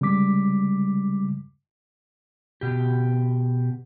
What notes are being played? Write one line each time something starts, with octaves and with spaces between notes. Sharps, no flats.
C#3 G3 G#3 D6 B6
B2 G4